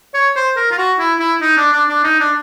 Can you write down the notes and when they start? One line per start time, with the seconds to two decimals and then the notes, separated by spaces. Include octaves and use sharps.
0.14 C#5
0.36 C5
0.56 A#4
0.71 F4
0.78 F#4
0.99 E4
1.19 E4
1.41 D#4
1.57 D4
1.73 D4
1.89 D4
2.04 D#4
2.20 D4